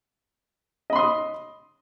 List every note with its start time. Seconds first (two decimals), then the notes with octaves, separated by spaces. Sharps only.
0.90 D#5
0.93 B5
0.96 C6
0.99 D#6